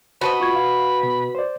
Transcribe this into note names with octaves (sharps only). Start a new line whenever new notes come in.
F#4 B4 C5 D#5 A5 B5
F4 C#6 G#6
F5
B2
C5 D5